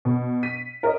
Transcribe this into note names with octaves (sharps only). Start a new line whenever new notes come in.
B2
B6 D#7
A#4 C#5 D#5